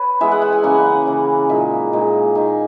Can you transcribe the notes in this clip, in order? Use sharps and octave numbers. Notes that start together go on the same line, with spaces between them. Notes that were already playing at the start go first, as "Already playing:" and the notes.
Already playing: B4 C#5
E3 G#3 B3 E5
F#5
F#5
G#5
C#3 E3 A#3 F#5
C#3 E3 A#3
A#2 G#3 D#4 E5
A#2 G#3 D#4
D#3 A#3 D#4 G#5